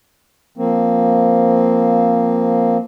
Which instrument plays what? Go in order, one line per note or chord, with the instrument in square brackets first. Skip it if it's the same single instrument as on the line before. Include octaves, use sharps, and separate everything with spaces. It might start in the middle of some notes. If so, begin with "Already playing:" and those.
[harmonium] F3 A#3 C4